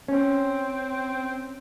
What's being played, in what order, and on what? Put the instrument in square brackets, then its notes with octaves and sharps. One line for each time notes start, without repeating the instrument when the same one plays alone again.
[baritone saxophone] C4 [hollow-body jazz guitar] C#4